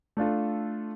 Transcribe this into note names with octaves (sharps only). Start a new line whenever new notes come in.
A3 D4 F4 A4